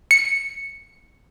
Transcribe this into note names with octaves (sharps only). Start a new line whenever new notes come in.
C#7